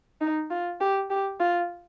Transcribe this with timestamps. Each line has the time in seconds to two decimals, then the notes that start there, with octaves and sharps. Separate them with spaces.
0.21 D#4
0.50 F4
0.80 G4
1.10 G4
1.40 F4